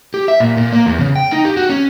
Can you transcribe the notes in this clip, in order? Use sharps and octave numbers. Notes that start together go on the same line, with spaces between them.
G4
E5
A#2
A#2
A#3
E2
C#3
G5
D#4
G4
F#4
C#4